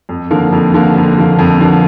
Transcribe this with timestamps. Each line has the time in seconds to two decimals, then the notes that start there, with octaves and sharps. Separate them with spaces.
0.09 F2
0.31 D3 F3 A#3
0.52 F2
0.74 D3 F3 A#3
0.96 F2
1.17 D3 F3 A#3
1.39 F2
1.60 D3 F3 A#3